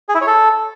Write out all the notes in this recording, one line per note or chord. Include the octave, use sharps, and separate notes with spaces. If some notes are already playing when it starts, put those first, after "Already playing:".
G#4
E4
C#5
A4